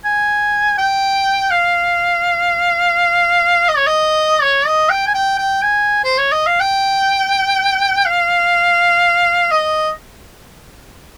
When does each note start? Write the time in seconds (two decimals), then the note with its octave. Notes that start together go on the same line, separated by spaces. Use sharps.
0.05 G#5
0.78 G5
1.51 F5
3.69 D#5
3.77 C#5
3.87 D#5
4.42 C#5
4.66 D#5
4.90 G5
5.07 G#5
5.14 G5
5.38 G5
5.62 G#5
6.04 C5
6.18 C#5
6.32 D#5
6.47 F5
6.60 G5
8.06 F5
9.51 D#5